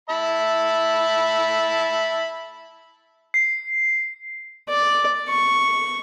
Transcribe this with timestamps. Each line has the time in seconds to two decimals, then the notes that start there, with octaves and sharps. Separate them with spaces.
0.09 E5 A5 B5
3.34 C7
4.69 D5
5.29 C#6